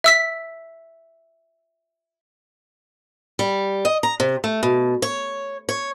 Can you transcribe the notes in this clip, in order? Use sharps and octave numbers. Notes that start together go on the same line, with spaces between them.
E5 E6 B6
G3
D#5
A#5
C3
A3
B2
C#5
C#5